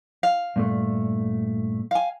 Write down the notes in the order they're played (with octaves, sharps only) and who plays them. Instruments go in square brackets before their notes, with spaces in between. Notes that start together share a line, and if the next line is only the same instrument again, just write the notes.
[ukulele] F5
[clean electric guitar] G2 A#2 A3
[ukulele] F5 G#5